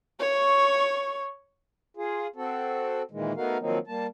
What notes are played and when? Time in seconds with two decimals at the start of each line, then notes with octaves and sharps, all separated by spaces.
0.20 C#5 C#6
1.97 F4 G#4
2.36 C4 F#4 A4
3.11 A#2 D#3 E3 G#3
3.36 A3 B3 D#4 F#4 A#4 F5
3.60 D#3 F3 F#3 A#3 C4 D#4
3.87 G3 A#3 A5